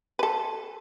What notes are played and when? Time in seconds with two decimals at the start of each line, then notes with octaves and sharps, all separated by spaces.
0.19 A4 B4